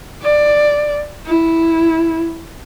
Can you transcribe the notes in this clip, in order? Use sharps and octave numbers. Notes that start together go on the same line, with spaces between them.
D5
E4